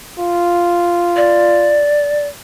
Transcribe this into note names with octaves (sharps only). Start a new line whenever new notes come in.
F4
D5